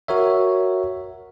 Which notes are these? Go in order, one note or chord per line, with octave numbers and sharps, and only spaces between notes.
F#4 A#4 C#5 E5